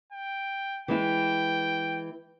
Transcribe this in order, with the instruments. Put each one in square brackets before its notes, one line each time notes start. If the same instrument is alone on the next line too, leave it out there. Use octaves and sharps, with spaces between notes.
[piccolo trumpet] G5
[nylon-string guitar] E3 G#3 E4 [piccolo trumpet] G5